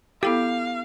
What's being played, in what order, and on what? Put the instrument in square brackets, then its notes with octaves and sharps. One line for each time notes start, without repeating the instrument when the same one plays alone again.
[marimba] B3 E4 A4 [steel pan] G4 [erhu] F5